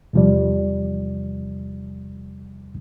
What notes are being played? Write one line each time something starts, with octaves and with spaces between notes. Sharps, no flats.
E2 C3 F3 G3 D5